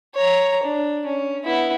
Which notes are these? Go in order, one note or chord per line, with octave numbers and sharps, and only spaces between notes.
C#5 A#5
D4
C#4
B3 E4